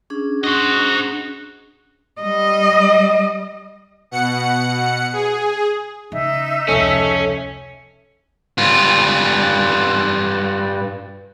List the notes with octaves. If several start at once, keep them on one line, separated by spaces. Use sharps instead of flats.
C#4 D4 G#4
F#4 C5 D#5
G3 D#5
B2 F#5 C#7
G#4
C#3 D#4 E5
F1 C#2 C#4 A4
G2 F4